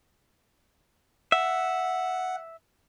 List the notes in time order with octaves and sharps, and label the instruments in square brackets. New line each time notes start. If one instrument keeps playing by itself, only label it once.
[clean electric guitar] E5 [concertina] F#5